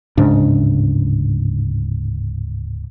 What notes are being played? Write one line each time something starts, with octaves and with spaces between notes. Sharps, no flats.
D1 G#2 C#3 D4